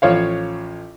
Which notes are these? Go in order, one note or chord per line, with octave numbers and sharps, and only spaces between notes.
A1 F3 C#5 F5